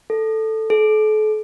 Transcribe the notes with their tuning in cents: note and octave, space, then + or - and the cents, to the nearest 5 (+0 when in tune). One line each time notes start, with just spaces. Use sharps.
A4 +0
A4 -40